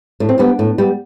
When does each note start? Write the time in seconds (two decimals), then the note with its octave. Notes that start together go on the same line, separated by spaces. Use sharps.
0.20 A2 D4
0.29 C4
0.38 G3 B3 D4
0.59 A2
0.78 G3 B3